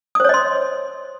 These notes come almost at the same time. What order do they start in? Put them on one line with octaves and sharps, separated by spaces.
D#6 C5 C#5 D#5 C6